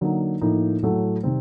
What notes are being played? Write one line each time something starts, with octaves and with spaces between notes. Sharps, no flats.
D3 F#3 A#3 D#4
A2 F3 A#3 D#4
A2 F#3 A3
C3 D#3 G3 C4